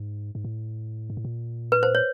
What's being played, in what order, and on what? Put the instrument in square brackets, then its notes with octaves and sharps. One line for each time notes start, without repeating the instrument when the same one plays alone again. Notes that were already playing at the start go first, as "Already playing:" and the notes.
Already playing: [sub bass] G#2
G#2
A2
G#2
A2
A#2
[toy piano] B4
C5
C#5